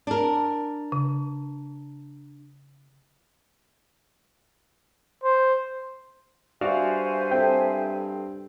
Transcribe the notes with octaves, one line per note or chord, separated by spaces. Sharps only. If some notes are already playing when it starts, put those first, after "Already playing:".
D4 A#4
C#3
C5
G2 F#4 C5 D5 E5 F5 G#5
C4 A4 G5